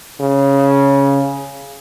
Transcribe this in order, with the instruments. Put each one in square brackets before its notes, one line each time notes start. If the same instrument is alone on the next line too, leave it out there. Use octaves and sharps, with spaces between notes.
[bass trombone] C#3